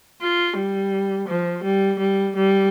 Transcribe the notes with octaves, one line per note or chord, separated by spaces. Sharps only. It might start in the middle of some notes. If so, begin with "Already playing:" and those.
F4
G3
F3
G3
G3
G3